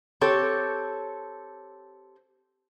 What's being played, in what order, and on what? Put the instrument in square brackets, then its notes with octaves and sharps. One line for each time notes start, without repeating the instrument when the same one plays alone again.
[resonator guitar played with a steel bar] C4 G4 A4 C#5